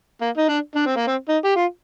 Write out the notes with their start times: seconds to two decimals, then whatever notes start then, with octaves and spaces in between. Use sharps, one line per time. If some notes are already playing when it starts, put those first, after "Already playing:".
0.21 A#3
0.37 D#4
0.49 D4
0.75 D4
0.86 C4
0.97 A#3
1.07 C4
1.29 D#4
1.44 G4
1.56 F4